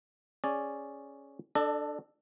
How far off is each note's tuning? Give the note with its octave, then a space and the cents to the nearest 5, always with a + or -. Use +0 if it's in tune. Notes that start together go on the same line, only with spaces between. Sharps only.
C#4 +0 G#4 +0 D5 +0
D4 +10 A4 +0 D#5 -45